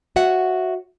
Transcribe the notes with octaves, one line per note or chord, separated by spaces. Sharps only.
F#4 C#5 E5 F#5